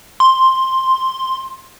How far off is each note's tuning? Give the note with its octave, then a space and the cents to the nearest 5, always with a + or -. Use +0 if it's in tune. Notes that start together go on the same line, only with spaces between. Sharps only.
C6 +5